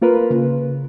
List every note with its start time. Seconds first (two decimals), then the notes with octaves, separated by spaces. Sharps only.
0.02 A#3 F4 A#4 B4
0.30 C#3